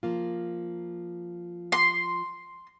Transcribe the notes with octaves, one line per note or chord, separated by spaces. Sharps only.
F3 A#3 F4
C6